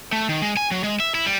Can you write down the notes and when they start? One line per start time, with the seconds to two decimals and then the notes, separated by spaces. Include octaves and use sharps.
0.12 A3
0.29 D#3
0.42 G#3
0.57 G#5
0.71 F#3
0.84 G#3
1.00 E5
1.15 E4
1.26 G3